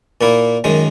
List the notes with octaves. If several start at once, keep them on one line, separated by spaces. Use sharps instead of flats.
A#2 A#3 E4
F#2 D#3 G#3